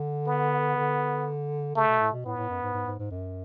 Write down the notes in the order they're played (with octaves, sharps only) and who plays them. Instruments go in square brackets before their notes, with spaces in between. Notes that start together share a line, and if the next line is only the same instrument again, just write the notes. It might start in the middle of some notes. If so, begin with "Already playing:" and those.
Already playing: [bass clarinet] D3
[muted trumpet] B3
[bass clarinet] D3
[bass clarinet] C#3 [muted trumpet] A3
[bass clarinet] B2
A2
B2
[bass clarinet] A2 [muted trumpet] B3
[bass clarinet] A2
F#2
G#2
G#2
G#2
G#2
F#2